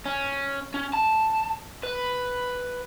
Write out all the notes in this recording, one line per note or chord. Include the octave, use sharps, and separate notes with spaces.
C#4
C#4
A5
B4